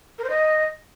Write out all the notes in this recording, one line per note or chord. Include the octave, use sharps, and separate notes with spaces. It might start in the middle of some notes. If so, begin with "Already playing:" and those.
A#4
C5
D#5